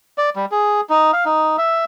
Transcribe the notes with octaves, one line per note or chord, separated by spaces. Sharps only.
D5
G3
G#4
D#4
F5
D#4
E5